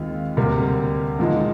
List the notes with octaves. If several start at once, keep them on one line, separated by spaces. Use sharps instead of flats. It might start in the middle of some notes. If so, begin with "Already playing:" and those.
Already playing: D#2 D#3 G#3 C4 F4
D2 C3 G3 A#3
A#2 F3 G#3 D#4